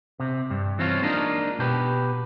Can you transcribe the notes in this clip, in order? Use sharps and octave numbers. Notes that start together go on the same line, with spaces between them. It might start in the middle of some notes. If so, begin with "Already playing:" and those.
C3
G2
E3 C4 C#4 F4
G#3 A#3 D4 D#4 F4
B2 G4 B4